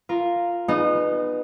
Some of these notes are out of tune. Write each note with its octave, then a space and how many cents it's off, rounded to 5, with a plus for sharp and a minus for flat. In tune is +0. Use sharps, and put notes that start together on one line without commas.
F4 +0 A#4 -5
B3 +0 D#4 -30 G#4 +5